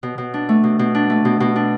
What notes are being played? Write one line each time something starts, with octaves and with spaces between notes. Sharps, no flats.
B2
B2
D4
A3
B2
B2
D4
A3
B2
B2
D4